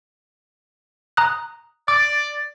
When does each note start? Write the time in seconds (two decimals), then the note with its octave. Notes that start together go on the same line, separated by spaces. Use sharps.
1.17 A#5 D#6 F#6
1.88 D5 D6